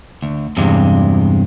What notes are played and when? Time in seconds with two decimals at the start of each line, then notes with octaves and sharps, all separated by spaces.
0.23 D2
0.57 E2 G2 C3 G#3